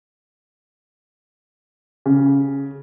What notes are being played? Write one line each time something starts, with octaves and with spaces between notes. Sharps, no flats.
C#3